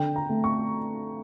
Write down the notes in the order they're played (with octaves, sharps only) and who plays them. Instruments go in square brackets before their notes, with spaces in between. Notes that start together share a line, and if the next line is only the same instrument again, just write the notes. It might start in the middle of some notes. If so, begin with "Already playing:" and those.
Already playing: [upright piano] D3 G5
A#5
A3
C#6